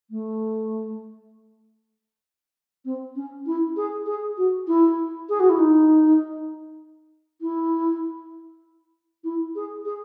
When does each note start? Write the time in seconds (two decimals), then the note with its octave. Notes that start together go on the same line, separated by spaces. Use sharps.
0.11 A3
2.85 C4
3.16 C#4
3.46 E4
3.77 G#4
4.06 G#4
4.38 F#4
4.68 E4
5.29 G#4
5.40 F#4
5.50 E4
5.59 D#4
7.42 E4
9.24 E4
9.55 G#4
9.85 G#4